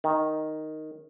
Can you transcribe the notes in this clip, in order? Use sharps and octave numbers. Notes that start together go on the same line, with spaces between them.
D#3